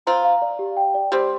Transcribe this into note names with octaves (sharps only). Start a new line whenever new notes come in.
C4 F4 A#5
F5
D5
G4
G5
D5
G3 C4 G4